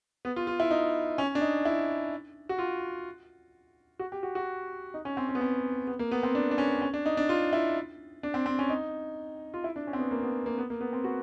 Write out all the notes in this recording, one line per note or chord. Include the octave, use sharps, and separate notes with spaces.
B3
F4
F4
E4
D#4
C#4
D4
D#4
E4
F#4
F4
F#4
G4
F#4
F#4
D#4
C#4
C4
C#4
B3
C4
B3
A#3
B3
C4
D4
D4
C#4
C#4
D4
D#4
D4
F4
E4
D4
C4
C4
C#4
D#4
F4
E4
D4
C#4
C4
B3
A#3
B3
A#3
B3
A#3
B3
C4
F#4